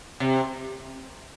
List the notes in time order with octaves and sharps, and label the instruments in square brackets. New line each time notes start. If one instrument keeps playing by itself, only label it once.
[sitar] C3